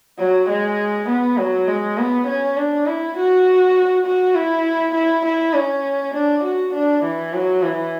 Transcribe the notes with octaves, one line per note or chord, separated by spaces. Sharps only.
F#3
G#3
B3
F#3
G#3
B3
C#4
D4
E4
F#4
F#4
E4
E4
E4
C#4
D4
F#4
D4
E3
F#3
E3